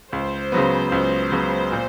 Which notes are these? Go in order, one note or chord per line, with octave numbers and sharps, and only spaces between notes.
C#2 C5
C#3 F#3 B3
C#2
C#3 F#3 B3
A#2